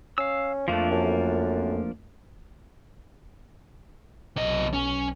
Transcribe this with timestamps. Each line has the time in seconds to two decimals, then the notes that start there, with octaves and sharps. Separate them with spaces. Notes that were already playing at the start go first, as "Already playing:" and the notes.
0.18 C#4 F5 E6
0.68 F2 F3 A3 A#3 D4 F4
0.91 F#2
4.36 B1 C3 D#5
4.73 C#4